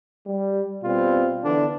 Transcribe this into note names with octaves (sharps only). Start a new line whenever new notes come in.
G3
B2 G3 C4 F4
D3 E3 B3 D4